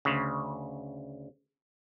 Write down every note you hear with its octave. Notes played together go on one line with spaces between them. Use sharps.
D2 C#3